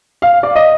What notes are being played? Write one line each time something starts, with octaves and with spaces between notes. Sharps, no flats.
F5
D5
D#5